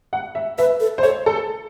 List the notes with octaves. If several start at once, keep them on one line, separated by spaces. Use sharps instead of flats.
F#5
E5
B4 E5
A4
C5
A4 C#5
A4